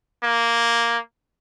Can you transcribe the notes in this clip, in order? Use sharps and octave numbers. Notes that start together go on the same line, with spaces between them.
A#3